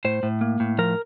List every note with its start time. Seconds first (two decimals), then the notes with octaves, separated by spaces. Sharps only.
0.05 A2 C5
0.23 A2
0.41 A#3
0.60 A2
0.78 F3 A#4